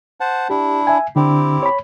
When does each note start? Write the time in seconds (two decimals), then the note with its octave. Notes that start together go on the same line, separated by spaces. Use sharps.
0.20 C5 F#5 A5
0.50 D4 E4 G4
0.87 E5 G#5
1.16 D3 C4 D4 E4 G4
1.63 C#5 B5